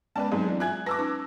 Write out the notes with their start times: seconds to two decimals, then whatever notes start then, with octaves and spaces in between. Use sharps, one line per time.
0.16 G#3 B3 C#4 B4 D5 A5
0.32 G#2 F#3 C4
0.46 E3 D4
0.60 F4 E5 G#5 F#6 G#6
0.86 B4 A5 D6 E6 A#6
0.98 C#4 D#4 B4